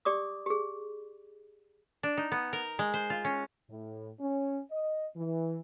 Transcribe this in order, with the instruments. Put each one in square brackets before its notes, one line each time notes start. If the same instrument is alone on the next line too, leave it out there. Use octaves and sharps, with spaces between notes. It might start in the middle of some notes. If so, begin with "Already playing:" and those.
[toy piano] G4 D5 D6 D#6
G4 G#4
[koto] D4
D#4
B3
A#4
G#3
C5
F4
C#4
[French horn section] A2
C#4
D#5
E3